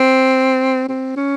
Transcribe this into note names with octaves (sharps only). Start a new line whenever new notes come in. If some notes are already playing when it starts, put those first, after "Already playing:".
Already playing: C4
C4
C#4